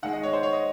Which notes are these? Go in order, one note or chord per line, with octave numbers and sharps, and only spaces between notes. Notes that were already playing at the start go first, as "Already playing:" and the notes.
D#3 G#3 F#5
D#5
C#5
C5
C#5
D#5